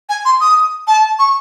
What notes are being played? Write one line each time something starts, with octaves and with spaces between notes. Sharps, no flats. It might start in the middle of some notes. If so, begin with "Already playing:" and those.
G#5
C6
D#6
A5
C#6